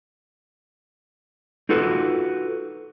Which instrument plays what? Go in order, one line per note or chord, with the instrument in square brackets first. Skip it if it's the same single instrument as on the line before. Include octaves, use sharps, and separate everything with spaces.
[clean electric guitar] D#4 F4 F#4 A4 B4